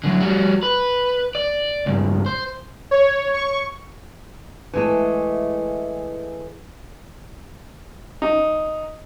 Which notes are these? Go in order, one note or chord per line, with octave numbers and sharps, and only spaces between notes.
D3 F#3
G3 F#4
B4
D5
C#2 G2
C5
C#5
C#6
E3 G#3 A3
D#4